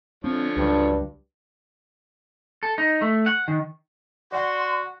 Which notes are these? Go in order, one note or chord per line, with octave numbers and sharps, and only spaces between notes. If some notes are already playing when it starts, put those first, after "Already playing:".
D3 F3 C4 C#5
C#2 G2 F#3
A4
D#4
A3
F#5
D#3
F#4 D5 F#5 C6